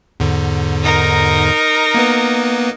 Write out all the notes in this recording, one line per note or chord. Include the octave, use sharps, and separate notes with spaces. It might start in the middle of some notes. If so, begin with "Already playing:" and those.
E2 G#2 D3
D#4 A#4
A#3 B3 B4